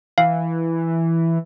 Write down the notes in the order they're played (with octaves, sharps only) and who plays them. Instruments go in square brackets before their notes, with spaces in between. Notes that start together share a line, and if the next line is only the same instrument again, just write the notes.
[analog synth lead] E3 [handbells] F5